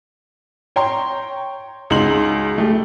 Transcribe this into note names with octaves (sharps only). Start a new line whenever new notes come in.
C#5 G5 A#5 C6
C#2 D#4 F#4 C6 F#7
A3 G4